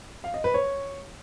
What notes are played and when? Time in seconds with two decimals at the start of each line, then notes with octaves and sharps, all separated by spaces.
0.24 F5
0.34 D#5
0.44 B4
0.54 C#5